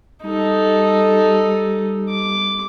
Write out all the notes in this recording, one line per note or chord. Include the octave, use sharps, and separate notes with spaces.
G3 D#4 A4
D6